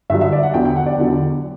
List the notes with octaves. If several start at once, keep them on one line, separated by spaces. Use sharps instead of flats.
G2 D3 F#3 E5
E5
D5
F#5
E2 D3 F#3 G5
G5
F#5
D5
E2 D3 F#3